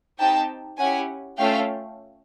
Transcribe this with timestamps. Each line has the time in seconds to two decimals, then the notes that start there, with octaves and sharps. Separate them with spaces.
0.19 C4 D#4 G4 G5 A5
0.78 C#4 E4 G4 F#5 G#5
1.37 A3 C#4 F4 A4 F5 G5